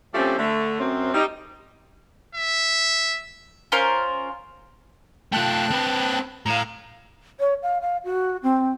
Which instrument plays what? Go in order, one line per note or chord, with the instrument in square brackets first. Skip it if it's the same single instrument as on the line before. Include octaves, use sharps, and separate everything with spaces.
[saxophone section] F3 G3 A3 C4 C#4
D3 A3
F#2 C4
G3 D#4
[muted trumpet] E5
[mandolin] C#4 F4 A#4 C5
[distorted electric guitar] A3 F4 [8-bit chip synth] G5 A5 F#6
[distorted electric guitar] C4 B4
[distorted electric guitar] A2 [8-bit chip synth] F5 A#5
[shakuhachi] C#5
F5
F5
F#4
C4